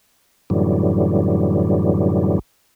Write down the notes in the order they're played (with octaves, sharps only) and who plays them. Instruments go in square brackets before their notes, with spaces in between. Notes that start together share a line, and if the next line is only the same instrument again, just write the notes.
[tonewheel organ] F#2 A2 D3 E3 F#3 G3